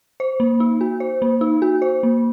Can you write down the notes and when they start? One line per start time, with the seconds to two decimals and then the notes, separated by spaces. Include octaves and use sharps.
0.20 C5
0.40 A#3
0.60 D#4
0.81 F#4
1.00 C5
1.22 A#3
1.41 D#4
1.62 F#4
1.82 C5
2.03 A#3